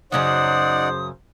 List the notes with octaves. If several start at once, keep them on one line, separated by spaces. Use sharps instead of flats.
F#2 C#3 F#3 D#4 C5 D5 F#5 D#6